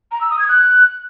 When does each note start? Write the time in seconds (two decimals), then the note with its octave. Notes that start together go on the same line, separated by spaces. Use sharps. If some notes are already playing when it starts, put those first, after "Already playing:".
0.12 A#5
0.21 E6
0.30 D#6
0.39 G#6
0.48 F#6